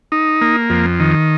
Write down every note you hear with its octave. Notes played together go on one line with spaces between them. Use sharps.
D#4
A#3
F2
D#3